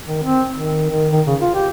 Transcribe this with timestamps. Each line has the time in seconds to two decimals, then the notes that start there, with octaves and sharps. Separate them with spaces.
0.06 D#3
0.23 C4
0.53 D#3
0.90 D#3
1.12 D#3
1.27 C#3
1.41 F4
1.54 G4